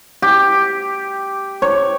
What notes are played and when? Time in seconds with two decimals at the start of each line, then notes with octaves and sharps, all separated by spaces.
0.22 G4
1.62 C#5